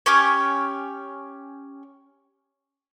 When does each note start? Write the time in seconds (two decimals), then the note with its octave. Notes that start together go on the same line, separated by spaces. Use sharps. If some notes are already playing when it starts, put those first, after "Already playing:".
0.06 C#4 G4 C#5